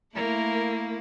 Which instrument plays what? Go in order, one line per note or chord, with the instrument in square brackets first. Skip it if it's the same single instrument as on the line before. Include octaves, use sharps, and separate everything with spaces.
[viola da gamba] A3 E4 [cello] A#3 [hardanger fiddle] A#4